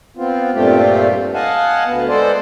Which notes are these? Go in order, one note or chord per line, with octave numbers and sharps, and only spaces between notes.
B3 C4 F4
G2 A#2 A3 C4 F4 G4
D#5 F5 F#5 G#5 A5
D2 B3
G#3 B3 A4 C5 D5